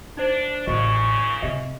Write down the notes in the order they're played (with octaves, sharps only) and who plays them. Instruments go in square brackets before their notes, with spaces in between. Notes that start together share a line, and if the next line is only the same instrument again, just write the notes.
[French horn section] D4 [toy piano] D#4 C5
[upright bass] A1 [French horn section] A#2 C#3 [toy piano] F#4 D#5 [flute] C#6
[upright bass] C3 [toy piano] G4 D#5 E5